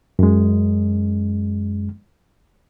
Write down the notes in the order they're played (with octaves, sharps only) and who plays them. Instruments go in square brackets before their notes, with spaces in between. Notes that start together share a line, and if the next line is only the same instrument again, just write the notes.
[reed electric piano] F#2 G#3